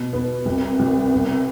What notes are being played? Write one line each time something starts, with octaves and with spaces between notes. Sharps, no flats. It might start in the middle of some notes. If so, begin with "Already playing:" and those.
Already playing: B2
B3
C2
C2
B3